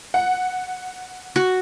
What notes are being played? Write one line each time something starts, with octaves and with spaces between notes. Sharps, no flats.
F#5
F#4